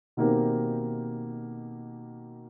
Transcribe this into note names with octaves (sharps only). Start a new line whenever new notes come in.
B2 D#3 A#3 C4 G4 A#4